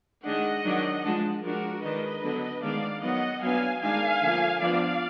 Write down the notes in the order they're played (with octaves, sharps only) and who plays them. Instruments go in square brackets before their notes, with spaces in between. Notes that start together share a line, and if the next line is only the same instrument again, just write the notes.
[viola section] D#3 G#3 D4 D#5 F#5
D#3 F#3 D4
F3 G#3 D4
F3 G#3 D4 F#4 A#4
D#3 G#3 D4 B4 D#5
D3 F#3 B3 D4
D#3 G#3 B3 D4 D5 F5
D#3 F#3 B3 D#5 F#5
F#3 B3 D4 F5 G#5
D#3 G#3 D4 F5 G#5
D3 F3 A#3
F3 B3 D4 D5 F5